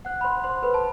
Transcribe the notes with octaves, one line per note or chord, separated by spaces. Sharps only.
C5 F#5 F#6
B5
C5 C6
C5 C6
A4 B4 B5
A5